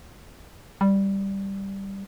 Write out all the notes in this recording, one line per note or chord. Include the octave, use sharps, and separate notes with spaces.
G3